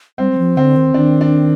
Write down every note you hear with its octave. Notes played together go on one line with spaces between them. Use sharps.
G3 C4
G3
F3
D3 C4
D#3
D#3 D4
D4